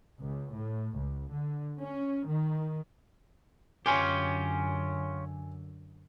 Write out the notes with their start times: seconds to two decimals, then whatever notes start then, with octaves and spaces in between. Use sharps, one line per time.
0.19 C#2
0.53 A2
0.95 C#2
1.31 D3
1.79 C#4
2.26 D#3
3.86 F#2 D3 C#4 F4 G4 G#5